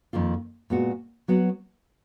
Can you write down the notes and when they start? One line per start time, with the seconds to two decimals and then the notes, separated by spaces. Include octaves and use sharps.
0.13 F2 D#3 A#3 F4
0.70 A#2 G#3 B3 F#4
1.28 F#3 B3 F#4